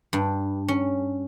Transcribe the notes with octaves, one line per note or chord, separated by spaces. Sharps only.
G2
C#4